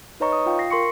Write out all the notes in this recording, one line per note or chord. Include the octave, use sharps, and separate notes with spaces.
D#4 B4 C#5 D#5 A#5 C#6
D#6
F4 F5 G5
A#6 C7
A#4 C6 C#6 C#7